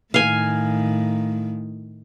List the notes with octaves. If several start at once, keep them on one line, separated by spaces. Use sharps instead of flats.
A2 D#3 F5 G#5